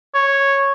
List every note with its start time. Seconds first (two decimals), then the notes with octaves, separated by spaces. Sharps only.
0.14 C#5